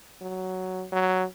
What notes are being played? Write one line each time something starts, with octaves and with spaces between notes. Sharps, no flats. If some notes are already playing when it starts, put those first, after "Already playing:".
F#3
F#3